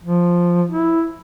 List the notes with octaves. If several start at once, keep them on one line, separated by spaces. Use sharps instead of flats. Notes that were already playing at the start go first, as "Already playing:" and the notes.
F3
E4